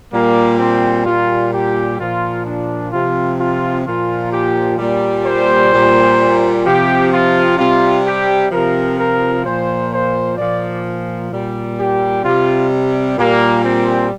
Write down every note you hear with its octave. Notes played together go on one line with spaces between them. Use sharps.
A#2 G3 A#3
C4
A#2 G3 F4
G4
A#2 F3 F4
D4
C3 F3 F4
F4
A#2 F3 F4
G4
A#2 G3
C5
A#2 G3
C3 F3 G4
F4
C3 G3 F4
G4
C3 F3 A#4
A#4
A#2 F3 C5
C5
A#2 F3 D5
A#2 G3
G4
C3 G3 F4
A#2 G3 A#3
C4